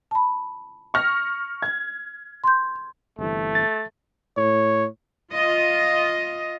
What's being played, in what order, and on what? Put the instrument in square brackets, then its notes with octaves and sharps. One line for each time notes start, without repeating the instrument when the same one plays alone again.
[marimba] A5 B5
[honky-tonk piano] C#6 F6 A#6
G#6
[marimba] C6 G6
[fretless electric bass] G1 C3 E3 [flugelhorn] A3
[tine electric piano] A6
[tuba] A2 [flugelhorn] C#5
[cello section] F4 D#5